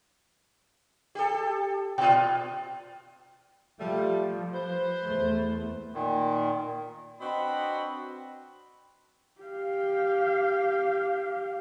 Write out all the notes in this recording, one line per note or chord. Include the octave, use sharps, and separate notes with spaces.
G4 A4
A#2 F4 G5
F3 G3 A3
B4 C5
E2 A3
A#2 D#3
C4 D4 F#4 B4 D#5 B5
G4 F5